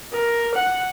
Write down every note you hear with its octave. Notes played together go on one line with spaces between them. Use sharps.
A#4
F#5